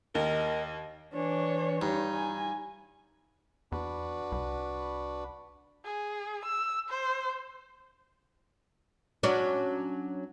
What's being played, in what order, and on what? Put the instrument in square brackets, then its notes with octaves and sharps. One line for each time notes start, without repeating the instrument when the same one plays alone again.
[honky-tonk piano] D#2 [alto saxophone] A#4 [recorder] D#5
[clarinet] E3 [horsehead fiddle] D4 C#5
[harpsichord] G2 [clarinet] D#4
[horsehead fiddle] G#5
[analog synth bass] E2 [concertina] D4 F#4 B4
[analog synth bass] C2
[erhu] G#4
E6
C5
[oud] F#3 C#4 D4